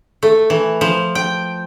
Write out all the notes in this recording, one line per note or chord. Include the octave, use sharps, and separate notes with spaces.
A3
E3
F3
G5